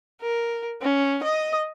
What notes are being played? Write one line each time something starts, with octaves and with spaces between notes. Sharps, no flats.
A#4
C#4
D#5 D#6